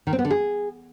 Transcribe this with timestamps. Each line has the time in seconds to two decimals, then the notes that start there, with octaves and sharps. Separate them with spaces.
0.07 D#3
0.13 C4
0.19 B3
0.25 D3
0.31 G#4